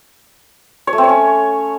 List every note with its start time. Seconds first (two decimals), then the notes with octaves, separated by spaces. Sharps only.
0.87 C#5
0.93 A3
0.98 C4
1.03 C#5
1.09 C#4